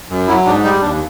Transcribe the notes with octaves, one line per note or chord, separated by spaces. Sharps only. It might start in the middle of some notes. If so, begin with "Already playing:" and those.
F#2
F#3 E4
G#2 D4
G3 D#4
D#2 D4